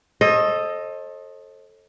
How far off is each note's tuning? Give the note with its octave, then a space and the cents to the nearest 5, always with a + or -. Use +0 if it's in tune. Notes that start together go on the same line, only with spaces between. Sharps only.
A4 +0 C5 +45 D#5 +0